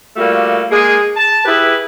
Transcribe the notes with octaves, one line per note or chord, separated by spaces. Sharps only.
G3 A3 A#3 F4 F#4
G#3 A#3 G#4
A5
E4 G4 G#4 B4